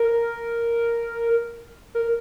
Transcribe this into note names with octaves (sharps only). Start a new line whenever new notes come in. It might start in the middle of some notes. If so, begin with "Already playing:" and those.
Already playing: A#4
A#4